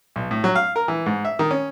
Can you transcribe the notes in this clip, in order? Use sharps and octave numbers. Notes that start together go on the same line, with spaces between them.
B1
A2
F#3
F5
A#4
E3
G#2
E5
D#3
C#4